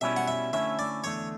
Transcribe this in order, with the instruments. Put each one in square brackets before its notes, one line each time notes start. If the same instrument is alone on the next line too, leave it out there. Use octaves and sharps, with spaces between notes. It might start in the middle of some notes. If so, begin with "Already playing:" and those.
[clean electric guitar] B2 G3 C#4 E4 [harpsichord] E5
[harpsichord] F#5
E5
[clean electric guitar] D3 A3 C#4 E4 [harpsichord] E5
[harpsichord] D5
[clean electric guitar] E2 D3 A3 [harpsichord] C#5